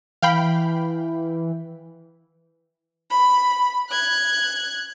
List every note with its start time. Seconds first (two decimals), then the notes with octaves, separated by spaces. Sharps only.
0.22 E3 F5 G5 B5
3.11 B5
3.90 F#6 G#6